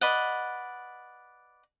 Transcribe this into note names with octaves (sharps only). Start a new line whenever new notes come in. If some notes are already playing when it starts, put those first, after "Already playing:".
B4 D5 D#5 F#5